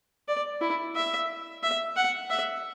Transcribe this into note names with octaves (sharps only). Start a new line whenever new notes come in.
D5
E4
E5
E5
F#5
E5